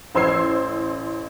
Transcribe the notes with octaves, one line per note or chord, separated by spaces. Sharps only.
A1 C5 C6 E6 G#6 C7